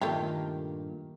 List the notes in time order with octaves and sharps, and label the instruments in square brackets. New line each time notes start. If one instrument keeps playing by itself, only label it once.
[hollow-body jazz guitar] G2 A#2 [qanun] D#3 A#3 [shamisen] A3 F4 G4